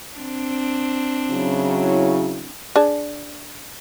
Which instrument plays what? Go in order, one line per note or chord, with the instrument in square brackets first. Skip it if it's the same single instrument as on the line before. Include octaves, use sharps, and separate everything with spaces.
[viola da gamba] C4 D4
[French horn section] C#3 F#3 E4
[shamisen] D4 G#4 A5